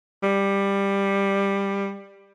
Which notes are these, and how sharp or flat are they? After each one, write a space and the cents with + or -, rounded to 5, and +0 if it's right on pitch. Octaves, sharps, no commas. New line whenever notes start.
G3 +15